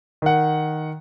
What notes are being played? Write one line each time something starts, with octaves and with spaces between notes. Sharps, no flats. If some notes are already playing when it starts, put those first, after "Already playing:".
D#3 F#5